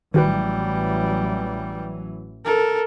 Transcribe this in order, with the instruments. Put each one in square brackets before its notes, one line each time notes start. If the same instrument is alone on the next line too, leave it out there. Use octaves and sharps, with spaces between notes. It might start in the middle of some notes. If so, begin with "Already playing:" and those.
[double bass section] A1 E3 F#3 [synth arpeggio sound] D#3 F#4 B4 [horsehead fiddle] G3
[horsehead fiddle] A4 A#4